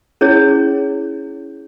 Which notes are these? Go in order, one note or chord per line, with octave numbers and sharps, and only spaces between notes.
C#4 E4 G#4 C#5